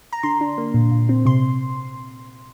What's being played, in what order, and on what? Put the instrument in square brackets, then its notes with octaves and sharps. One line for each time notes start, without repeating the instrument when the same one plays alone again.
[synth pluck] A#5
D3 C6
D4
A#3
A#2
A#2
C4
C3 C6